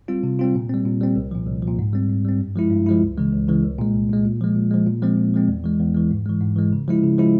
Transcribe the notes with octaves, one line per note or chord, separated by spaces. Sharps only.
G3 C4 F4
C3
G3 C4 F4
A#2
G3 C4
A#2
G3 C4
C2
A#2 F3
C2
F3
A#2
G#2
G3 C4
G#2
G3 C4
G2
F3 G#3 E4
G2
F3 G#3 E4
C#2
C#3 E3 G#3
C#2
C#3 E3 G#3
C2
A#2 G#3
C2
A#2 G#3
A#2
F3 G#3
A#2
F3 G#3
A#2
F3 G#3 C4
A#2
F3 G#3 C4
E2
E3 G#3
E2
E3 G#3
G#2
E3 G#3
G#2
E3 G#3
C#3
F3 G#3 E4
C#3
F3 G#3 E4